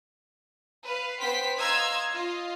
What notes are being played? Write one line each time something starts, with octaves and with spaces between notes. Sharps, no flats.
B4 F5
B3 C5 G5 C6 B6
D#5 F5 A#5 C6 E6 G#6
F4 D#5